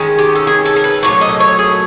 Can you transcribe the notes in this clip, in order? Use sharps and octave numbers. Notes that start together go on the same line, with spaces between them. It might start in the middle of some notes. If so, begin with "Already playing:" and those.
Already playing: D#3 G#3 C#4
G4
A4
G#4
A4
A#4
B4
A#2 F#3 A3 C#5
D#5
C#5
G#4